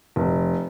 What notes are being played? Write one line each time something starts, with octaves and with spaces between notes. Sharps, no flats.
F1